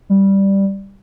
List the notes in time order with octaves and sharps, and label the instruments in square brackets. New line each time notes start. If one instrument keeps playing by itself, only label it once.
[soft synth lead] G3